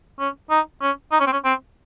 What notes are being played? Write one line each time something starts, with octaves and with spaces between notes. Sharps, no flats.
C#4
D#4
C#4
D#4
C#4
C4
C#4
C4